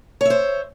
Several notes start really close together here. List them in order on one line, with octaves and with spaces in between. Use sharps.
C#5 E5 C5